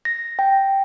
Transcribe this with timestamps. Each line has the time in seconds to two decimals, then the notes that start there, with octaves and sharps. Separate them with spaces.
0.05 A#6
0.39 G5